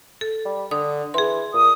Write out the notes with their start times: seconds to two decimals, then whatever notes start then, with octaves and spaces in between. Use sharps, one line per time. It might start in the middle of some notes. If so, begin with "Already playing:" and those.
0.21 A4
0.45 G3
0.71 D3 D#6
1.14 E3 G#4 C6
1.54 A#2 D#6